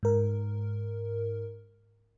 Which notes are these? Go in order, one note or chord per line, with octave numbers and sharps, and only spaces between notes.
G#2 A#4